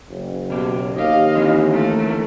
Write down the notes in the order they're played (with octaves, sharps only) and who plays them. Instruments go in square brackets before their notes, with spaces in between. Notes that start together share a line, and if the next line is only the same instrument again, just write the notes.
[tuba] F#1
[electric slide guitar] B2 G4
[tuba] D#2 [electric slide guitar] G4 [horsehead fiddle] D#5 F5
[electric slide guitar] D3 E3 C4
[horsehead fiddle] A3 A#4